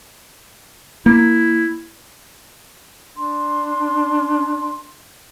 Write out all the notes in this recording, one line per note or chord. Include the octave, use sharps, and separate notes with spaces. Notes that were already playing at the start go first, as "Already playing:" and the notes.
A#3 E4
D4 C6